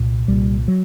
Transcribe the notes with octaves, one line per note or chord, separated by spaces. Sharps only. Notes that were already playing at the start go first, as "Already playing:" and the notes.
Already playing: C2 A#2
C2 A#2 G3
F#3